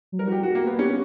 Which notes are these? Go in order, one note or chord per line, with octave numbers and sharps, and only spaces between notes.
F#3
G3 A#4
F#4
G4
F#4
A#3
B3
C#4 G4